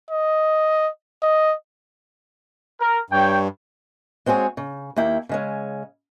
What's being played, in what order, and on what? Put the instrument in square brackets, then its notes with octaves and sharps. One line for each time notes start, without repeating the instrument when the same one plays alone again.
[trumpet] D#5
D#5
[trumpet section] A#4
[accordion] G2 [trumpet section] C#5 G5
[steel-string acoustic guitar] G#3 C4 F#4 G#4 C#5
C#3
D#2 A#3 E4 G5
C#3 G#3 C#4